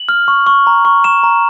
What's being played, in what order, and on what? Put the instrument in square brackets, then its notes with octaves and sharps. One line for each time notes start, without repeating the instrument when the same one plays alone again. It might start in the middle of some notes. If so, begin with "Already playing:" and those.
Already playing: [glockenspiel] F#7
F6
C#6
C#6
A#5
C#6
C#6 E7
A#5